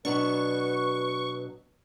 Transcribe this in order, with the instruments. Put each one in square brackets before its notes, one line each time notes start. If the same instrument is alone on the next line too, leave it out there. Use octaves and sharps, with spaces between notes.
[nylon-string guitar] B2 F#3 D4 [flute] B4 [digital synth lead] C#6